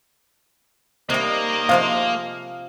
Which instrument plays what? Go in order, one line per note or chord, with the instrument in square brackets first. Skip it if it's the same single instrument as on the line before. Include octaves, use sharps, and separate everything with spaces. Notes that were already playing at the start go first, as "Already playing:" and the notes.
[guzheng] C3 G3 [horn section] D#3 D#5 [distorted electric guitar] A#3
[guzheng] C3 F3 G#3 [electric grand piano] F5